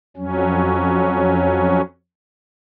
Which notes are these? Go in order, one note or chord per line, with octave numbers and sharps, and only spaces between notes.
F2 F#3 C#4